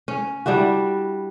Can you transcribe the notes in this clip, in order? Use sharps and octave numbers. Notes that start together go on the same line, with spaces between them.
C#4
G3 D4 E4 F#4